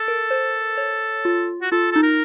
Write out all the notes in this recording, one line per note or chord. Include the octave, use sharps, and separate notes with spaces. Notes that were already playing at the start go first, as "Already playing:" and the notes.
Already playing: A4
A#4
C5
C#5
F4
F#4
F4 A4
D#4 A4
A#4